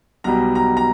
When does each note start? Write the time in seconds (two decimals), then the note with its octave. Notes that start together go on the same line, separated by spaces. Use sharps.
0.24 B1 B2 G3 A#5
0.55 A#5
0.77 A#5